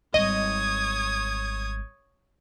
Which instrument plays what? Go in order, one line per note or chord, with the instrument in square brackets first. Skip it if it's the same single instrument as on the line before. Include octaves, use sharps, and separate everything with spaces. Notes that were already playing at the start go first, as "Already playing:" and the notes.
[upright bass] G#1 G3 [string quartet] C#5 D#6 G#6 [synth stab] D#5